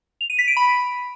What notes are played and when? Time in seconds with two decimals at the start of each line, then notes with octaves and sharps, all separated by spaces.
0.21 F7
0.30 D#7
0.39 B6
0.48 D7
0.57 B5